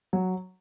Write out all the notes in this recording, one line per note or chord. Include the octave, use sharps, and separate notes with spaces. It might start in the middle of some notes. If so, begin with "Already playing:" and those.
F#3